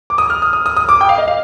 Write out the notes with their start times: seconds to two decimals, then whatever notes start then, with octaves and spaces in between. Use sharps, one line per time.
0.10 D6
0.18 D#6
0.30 F6
0.42 D#6
0.53 D#6
0.66 D#6
0.77 D#6
0.89 D6
1.01 G5
1.09 F5
1.18 D#5
1.28 F5